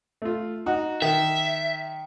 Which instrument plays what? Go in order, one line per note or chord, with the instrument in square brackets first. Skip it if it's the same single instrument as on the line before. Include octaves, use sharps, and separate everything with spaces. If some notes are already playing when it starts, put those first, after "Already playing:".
[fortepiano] A3 F4
D#4 F#4
[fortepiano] D#3 [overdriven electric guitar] E5